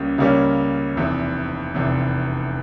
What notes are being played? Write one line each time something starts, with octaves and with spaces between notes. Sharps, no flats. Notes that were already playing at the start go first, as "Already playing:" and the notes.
Already playing: C#2 C#3 G3 A#3 C#4
C#2 C#3 G3 A#3 C#4
F1 E2 C3
F1 E2 C3